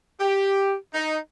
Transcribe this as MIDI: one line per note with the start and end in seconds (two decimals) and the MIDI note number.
0.20 0.75 67
0.93 1.17 63